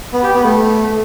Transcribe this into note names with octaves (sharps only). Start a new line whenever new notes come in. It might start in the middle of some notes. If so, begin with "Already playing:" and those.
B3
G4
B3
A3